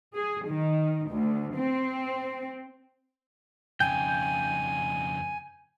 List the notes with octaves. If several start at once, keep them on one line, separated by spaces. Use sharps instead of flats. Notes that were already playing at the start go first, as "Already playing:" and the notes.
G#4
D#3
D2
C4
F2 C#3 G5 G#5